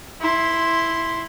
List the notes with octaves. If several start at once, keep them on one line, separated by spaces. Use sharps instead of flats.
E4 C6